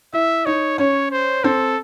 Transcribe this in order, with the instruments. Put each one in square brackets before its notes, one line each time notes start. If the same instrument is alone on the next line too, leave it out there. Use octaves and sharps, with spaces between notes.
[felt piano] E4 [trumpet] E5
[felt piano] D#4 [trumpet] C#5
[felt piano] C#4 [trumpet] C#5
[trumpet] C5
[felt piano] C4 [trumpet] A4